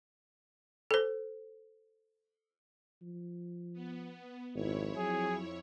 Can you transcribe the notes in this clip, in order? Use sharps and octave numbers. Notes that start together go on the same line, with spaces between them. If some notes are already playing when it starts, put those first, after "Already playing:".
A4 C5
F3
B3
G#1 F2 E4 C#5
F#3 G#4